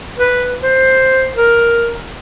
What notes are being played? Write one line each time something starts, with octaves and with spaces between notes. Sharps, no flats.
B4
C5
A#4